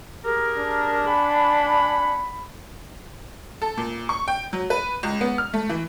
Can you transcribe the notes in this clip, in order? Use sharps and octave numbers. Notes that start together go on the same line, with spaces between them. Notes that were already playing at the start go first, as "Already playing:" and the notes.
G4 G#4 A#4
D4
F#5 G#5 B5
A4
A#2
C#6
G5
F#3
B4
C#2
B3
F6
A3
E3